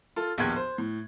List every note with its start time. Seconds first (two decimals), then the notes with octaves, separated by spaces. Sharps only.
0.16 F4 A4
0.38 A#1 D#2 B3 G5 F#6 G#6
0.56 C5
0.78 A2